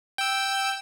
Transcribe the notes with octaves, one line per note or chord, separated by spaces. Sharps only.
G5 E6